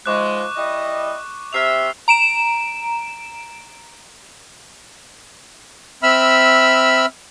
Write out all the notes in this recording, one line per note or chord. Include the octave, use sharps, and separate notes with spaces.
G#2 F3 G#3 C#6 D6 F#6
G3 E4 D#5
C3 E5 F6 C7 F7
A#5 D7 E7
C4 E5 B5 E6 F6